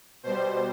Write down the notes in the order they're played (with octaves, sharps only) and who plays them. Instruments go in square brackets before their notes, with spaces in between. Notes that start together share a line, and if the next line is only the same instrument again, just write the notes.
[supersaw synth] B2 G3 C5